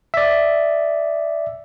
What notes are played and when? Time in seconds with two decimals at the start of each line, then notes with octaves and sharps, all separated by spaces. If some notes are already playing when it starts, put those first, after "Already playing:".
0.14 D5 E5